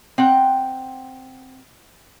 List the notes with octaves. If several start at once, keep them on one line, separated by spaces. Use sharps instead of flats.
C4 F#5 G5